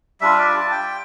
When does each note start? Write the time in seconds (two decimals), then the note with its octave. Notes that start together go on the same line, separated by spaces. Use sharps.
0.21 G3 D4 F4 E5
0.38 D5
0.54 A5
0.71 G5